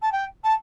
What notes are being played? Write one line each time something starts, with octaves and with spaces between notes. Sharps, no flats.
A5
G5
A5